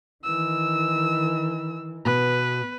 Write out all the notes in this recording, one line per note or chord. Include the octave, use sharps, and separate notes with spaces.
D#3 E3 E6
B2 B4